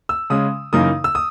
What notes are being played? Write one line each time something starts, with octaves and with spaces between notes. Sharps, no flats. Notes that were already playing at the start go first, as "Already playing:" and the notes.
E6
C#3 G#3 C#4 D#6
F#2 C#3 E3 A#3 D#4 D#6
E6
D#6